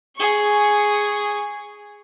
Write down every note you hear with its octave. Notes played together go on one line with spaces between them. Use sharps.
G#4 C#6